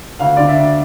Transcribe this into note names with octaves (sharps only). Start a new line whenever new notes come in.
D2 F5
D3 D5
E5
D2